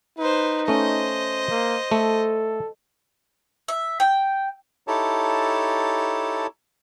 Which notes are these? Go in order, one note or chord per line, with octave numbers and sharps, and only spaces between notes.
D#4 B4 C5
A3 C#4 C5 D#5
A#3
A3 A4
E5
G5
D#4 E4 G4 A4 C#5 A5